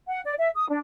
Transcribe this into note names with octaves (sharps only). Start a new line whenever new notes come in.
F#5
D5
E5
D#6
D4